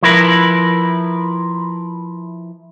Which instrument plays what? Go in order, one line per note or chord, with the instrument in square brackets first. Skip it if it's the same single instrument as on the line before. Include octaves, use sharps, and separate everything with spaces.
[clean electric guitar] F3 E4 A#4 B4